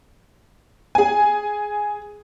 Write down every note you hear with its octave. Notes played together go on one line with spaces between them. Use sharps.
G#4 G#5